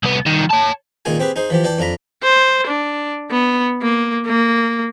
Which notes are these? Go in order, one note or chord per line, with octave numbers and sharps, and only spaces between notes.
C2 B3
C2 D#3
C#5 A5
C#2 A#2 D#3 F4 G#4 G#5
C4 G4 G#4 B4
D#4 G#4 C5
E3 F3 G4
E3 D5 G5 A5
F2 D4 F4 A#5 B5
C5
D4
B3
A#3
A#3